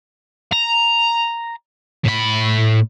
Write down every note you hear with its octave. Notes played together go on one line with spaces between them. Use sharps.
A#5
A2 B5